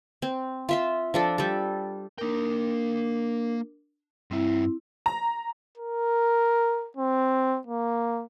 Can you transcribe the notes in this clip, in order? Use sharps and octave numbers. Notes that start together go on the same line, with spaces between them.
C4
F4 E5 C6
F3 D4 A4
G3 A4
A#3 D4 A#4 G5
G2 C4 E4 E5
A#5
A#4
C4
A#3